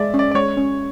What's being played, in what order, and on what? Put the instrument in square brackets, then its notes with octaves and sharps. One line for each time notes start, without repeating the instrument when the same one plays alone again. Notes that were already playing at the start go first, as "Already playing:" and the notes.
Already playing: [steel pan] G#3 [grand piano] D5 E5
[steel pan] C#4
[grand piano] D5
D5
[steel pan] G#3 [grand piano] C#5
[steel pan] C#4